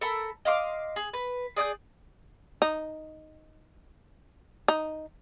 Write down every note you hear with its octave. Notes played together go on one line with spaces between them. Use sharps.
A4 A#4 A5 B5
D#5 F5 C6 D6
G#4
B4
G#4 D5 D#6 G6
D#4
D#4